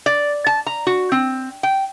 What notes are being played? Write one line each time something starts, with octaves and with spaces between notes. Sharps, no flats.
D5
A5
A#5
F#4
C4
G5